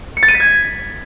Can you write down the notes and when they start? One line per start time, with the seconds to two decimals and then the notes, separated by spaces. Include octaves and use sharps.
0.17 C#7
0.23 A6
0.28 D#7
0.34 B6
0.40 G#6